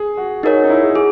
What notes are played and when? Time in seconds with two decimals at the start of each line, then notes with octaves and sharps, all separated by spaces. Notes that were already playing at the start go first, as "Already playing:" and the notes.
Already playing: G#4
0.17 F#4
0.43 D#4 G#4 A#4 C#5
0.56 F#4
0.64 D#4
0.69 E4
0.83 G#4
0.95 F#4 G#4